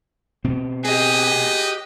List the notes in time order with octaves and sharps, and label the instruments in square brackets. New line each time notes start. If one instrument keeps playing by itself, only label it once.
[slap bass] B2 C4
[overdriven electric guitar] G4 G#4 [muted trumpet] B4 [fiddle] D#5